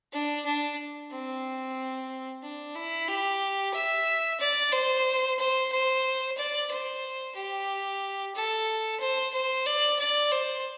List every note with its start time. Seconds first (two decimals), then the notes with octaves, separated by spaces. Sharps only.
0.12 D4
0.45 D4
1.11 C4
2.43 D4
2.75 E4
3.08 G4
3.74 E5
4.40 D5
4.73 C5
5.39 C5
5.72 C5
6.37 D5
6.71 C5
7.35 G4
8.35 A4
9.00 C5
9.33 C5
9.66 D5
9.99 D5
10.32 C5